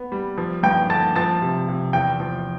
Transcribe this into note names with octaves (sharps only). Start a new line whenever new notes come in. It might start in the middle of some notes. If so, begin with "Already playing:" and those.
Already playing: B3
G3
F3
G2 G5 G6
D3 A5 A6
F3 A5 A6
C3
C3
E2 G5 G6
F3